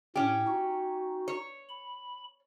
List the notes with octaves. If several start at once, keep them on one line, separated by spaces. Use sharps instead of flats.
A2 C#4 G4
D#4 F#4
C#5
B5